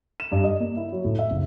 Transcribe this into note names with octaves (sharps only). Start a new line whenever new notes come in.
E7
G2
D#5
A#3
E4
F#3
A2
E5
F#1